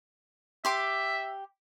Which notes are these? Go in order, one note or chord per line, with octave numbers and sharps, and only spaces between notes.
G4 E5 C6 D6